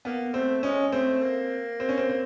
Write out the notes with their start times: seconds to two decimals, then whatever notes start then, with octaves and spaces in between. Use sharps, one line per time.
0.05 A#3 B3
0.34 A3 C4
0.63 G#3 C#4
0.92 A3 C4
1.22 A#3
1.80 C4
1.89 C#4
1.98 C4
2.09 C4